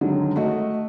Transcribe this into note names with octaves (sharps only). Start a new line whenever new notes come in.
D3 D#3 F#3 G#3
A3 F#4 D#5